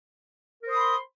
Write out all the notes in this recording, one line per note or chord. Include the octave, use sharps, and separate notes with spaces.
A#4 C5 B5 C6 D#6